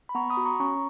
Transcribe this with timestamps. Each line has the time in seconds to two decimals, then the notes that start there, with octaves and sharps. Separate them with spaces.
0.09 B5
0.15 B3 A#5 C#6
0.30 B5 D#6
0.37 F#4
0.45 A#5 C#6
0.60 C#4 A#5 C#6